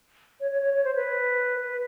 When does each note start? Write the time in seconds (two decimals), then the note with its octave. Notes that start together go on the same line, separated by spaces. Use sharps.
0.40 C#5
0.51 C#5
0.62 C#5
0.74 C#5
0.84 C5
0.96 B4
1.62 B4